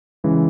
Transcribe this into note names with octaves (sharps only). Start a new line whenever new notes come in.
C#3 E3 G#3